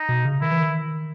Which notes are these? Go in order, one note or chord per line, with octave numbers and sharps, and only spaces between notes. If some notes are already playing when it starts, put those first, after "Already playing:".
Already playing: D#4
B2
C#3
D#3 E4
E3
D#3